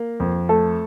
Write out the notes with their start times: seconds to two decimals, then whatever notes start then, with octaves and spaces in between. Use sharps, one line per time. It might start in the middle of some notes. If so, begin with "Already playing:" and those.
Already playing: A#3
0.20 F2
0.49 A3 A4